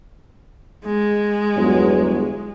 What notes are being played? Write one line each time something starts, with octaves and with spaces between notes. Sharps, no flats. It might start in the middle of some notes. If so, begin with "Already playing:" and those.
G#3
G1 E2 F#3